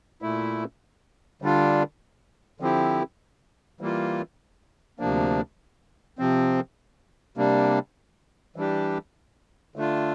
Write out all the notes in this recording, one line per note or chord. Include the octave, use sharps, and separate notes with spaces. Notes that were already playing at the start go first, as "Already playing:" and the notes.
A#2 A3 E4
D3 G3 D4 F4
D3 F3 C4 E4 G4
E3 G3 A#3 F4
D2 C3 F3 A#3 D4
C3 F3 C4
C3 G3 A#3 D4
E3 G3 D4 G4
D3 A3 D4 F4